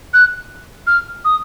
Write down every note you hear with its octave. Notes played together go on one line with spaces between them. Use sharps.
F#6
F6
D#6